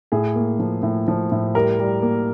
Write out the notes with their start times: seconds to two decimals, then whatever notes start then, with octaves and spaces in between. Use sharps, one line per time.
0.12 A2 G#4
0.36 A#3
0.59 F3
0.83 A2
1.08 F3
1.32 A2
1.55 G3 A#4
1.79 G3
2.02 A#3